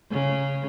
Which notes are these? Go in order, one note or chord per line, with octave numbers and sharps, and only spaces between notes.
C#3